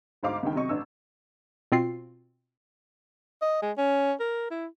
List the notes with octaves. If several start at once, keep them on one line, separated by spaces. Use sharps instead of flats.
D2 G#2 C5 F5 D6
C#2 G2 D#3 G5
C3 F#3 D#5 C#6
A1 D4 E6
B2 C4 F4 C7
D#5
G#3
C#4
A#4
E4